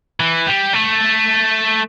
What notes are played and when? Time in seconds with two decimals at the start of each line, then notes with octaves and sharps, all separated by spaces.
0.20 E3
0.47 G3
0.74 A3